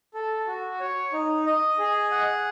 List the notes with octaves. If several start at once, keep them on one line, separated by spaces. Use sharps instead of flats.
A4
F#4
C#5
D#4
D#5
G#4
F#5